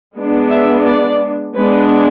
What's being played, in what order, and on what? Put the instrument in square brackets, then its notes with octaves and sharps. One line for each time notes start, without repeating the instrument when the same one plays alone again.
[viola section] G#3 B3 D4
E5
D5
G#3 B3 D4 B4